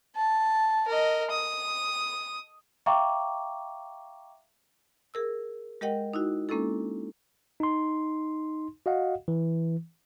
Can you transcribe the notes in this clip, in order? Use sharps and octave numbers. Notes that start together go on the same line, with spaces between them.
A5
A#4 D#5
D#6
E5 F5 G5 A#5 C#6 D6
G#4 A#4 E6
G#3 G4 A#4 D#5 F#5 G5
D#4 E4 F#4
G#3 A#3 C#4 D4 E4 A4
D#4 C6
F#4 D#5 F5 F#5
E3